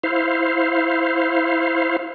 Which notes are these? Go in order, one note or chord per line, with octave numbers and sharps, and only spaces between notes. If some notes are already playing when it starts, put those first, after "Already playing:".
E4 C5 F5